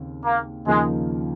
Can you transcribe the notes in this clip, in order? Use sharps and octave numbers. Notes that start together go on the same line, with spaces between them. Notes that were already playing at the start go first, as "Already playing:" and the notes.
Already playing: D#2 C#3 C4
A#3
D#2 C#3 F3 G#3 A#3 D#4